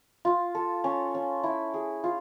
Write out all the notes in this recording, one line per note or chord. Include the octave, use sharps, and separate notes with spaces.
F4
A4
C#4
C#4
E4
G#4
F4